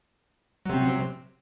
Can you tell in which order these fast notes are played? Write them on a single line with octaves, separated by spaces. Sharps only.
F#3 C3 C4